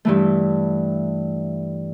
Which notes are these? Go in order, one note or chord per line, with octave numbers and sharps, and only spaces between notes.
G2 E3 A3